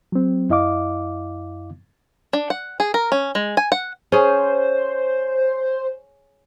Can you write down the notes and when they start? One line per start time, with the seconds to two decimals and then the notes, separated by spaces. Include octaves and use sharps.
0.12 F#3 C4
0.50 F#2 E4 D#5 F5 D6
2.33 D4
2.50 F#5
2.80 G#4
2.94 A#4
3.12 C#4
3.35 G#3
3.57 G#5
3.72 F#5
4.12 C#4 G#4 C5